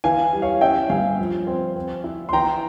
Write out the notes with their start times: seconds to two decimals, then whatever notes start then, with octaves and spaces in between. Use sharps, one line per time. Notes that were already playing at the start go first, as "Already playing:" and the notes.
0.04 E3 F5 G#5
0.33 G3
0.42 C#5 F5
0.61 C#4 E5 G5
0.90 G2 F5 G#5
1.19 F3
1.47 C4
1.76 C4
2.04 E4
2.29 C6
2.33 E3 G5 A#5